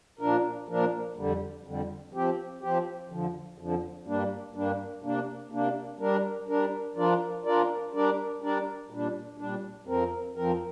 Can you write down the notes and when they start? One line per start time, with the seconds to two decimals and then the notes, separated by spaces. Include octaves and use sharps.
0.19 A#2 F3 D4 A#4
0.68 A#2 F3 D4 A#4
1.17 F2 D3 G3
1.64 F2 D3 G3
2.13 F3 C4 G4
2.61 F3 C4 G4
3.10 F2 D3 F3
3.58 F2 D3 F3
4.07 G2 G3 A#3 D4
4.55 G2 G3 A#3 D4
5.03 C3 A#3 D4
5.52 C3 A#3 D4
6.00 G3 D4 A#4
6.48 G3 D4 A#4
6.97 F3 D4 F4 A#4 D5
7.45 F3 D4 F4 A#4 D5
7.93 G3 D4 A#4 D5
8.42 G3 D4 A#4 D5
8.91 A#2 G3 D4
9.38 A#2 G3 D4
9.86 F2 F3 C4 A#4
10.36 F2 F3 C4 A#4